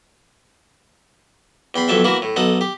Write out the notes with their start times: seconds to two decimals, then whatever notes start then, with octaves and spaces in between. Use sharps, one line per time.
1.74 E2 G5 B5 C6
1.88 B1 F2 A4 E5 G5
2.04 E3 A#3 E4 F#4
2.22 A2
2.36 B1 D#4 A4 F#5
2.61 G4